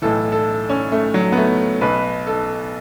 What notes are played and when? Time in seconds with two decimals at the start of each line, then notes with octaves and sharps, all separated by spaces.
0.02 B1 A2 E3 A4
0.32 A4
0.70 C#4
0.92 A3
1.14 F#3
1.32 B3
1.37 A3
1.81 B1 B2 B4
2.27 A4